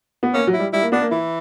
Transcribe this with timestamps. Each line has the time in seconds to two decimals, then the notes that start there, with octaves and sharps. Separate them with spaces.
0.23 B3
0.33 A#3 C#4
0.47 F#3
0.53 E4
0.59 G3
0.73 G3 E4
0.82 A#3
0.92 B3 D4
1.02 A#3
1.11 E3 E4